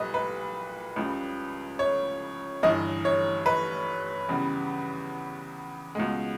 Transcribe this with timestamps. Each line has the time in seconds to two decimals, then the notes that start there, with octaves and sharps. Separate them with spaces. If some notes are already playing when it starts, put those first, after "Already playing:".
Already playing: B1 A#2 G3 B4 D#5
0.14 B4
0.96 C#2 C#3 G3
1.79 C#5
2.63 G1 G2 E3 D#5
3.05 C#5
3.46 B4
4.29 E2 C#3 G3
5.95 C#2 B2 G#3